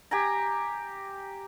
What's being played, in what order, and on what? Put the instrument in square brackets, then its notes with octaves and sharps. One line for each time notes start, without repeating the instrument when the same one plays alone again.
[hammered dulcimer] G4 G#5 A#5